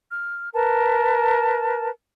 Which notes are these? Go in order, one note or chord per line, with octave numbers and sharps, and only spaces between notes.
F6
A#4 B4 A5